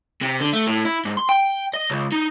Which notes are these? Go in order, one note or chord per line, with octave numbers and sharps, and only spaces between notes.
C3
D3
A3
A2
E4
G#2
C6
G5
D#5
C#2
D#4